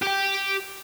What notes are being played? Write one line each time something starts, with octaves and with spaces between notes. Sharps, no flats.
G4 G5